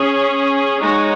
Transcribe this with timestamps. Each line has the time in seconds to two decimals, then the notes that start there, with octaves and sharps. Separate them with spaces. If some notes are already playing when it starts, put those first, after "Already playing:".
Already playing: C#4 G#4 C#5
0.81 G#3 D#4 F#4 C#5